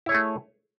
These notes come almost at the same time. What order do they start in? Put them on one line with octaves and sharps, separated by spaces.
E4 C#5 G#4 A3